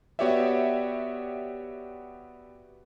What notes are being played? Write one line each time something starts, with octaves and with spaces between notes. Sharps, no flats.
B3 F#4 G4 C#5 D5 E5